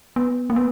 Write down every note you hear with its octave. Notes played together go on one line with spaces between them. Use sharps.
B3
A#3
B3